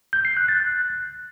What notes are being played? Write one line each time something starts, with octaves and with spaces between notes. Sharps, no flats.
G6
C7
F#6
A6
F#6